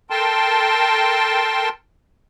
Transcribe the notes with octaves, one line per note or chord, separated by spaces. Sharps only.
A4 A#4 G5 A5 C6